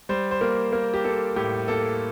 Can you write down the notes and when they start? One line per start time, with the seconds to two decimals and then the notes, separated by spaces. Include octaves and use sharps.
0.09 G3 C5
0.31 C5
0.41 A#3 A#4
0.72 A#3 A#4
0.94 G4
1.04 A#3 A4
1.36 A2 G4
1.68 A#3 A4